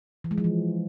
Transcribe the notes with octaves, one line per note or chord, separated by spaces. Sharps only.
E3
G#3
F3
E3